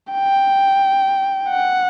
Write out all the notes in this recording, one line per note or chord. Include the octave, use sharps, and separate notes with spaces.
G5
F#5